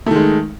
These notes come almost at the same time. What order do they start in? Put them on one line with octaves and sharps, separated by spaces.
A3 D#3 G#3